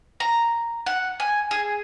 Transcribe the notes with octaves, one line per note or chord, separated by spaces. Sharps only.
A#5
F#5
G#5
G#4